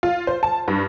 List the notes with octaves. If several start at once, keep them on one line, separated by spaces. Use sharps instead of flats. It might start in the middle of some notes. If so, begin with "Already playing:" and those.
F4
C5
A5
G2